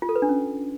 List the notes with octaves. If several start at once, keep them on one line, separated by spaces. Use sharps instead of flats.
F4
A4
B4
D4
C#4